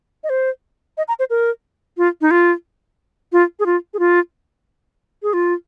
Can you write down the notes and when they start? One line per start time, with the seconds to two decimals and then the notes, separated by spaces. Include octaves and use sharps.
0.24 D#5
0.30 C5
0.98 D#5
1.08 A#5
1.19 C5
1.30 A#4
1.98 F4
2.21 D#4
2.31 F4
3.32 F4
3.59 G#4
3.66 F4
3.94 G#4
3.99 F4
5.23 G#4
5.33 F4